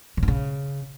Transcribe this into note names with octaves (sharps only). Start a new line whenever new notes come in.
C#3
A#2
C#3